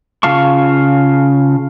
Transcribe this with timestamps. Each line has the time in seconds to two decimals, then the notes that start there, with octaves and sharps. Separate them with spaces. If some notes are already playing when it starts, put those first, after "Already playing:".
0.23 C#3 F4 F5 A5 C#6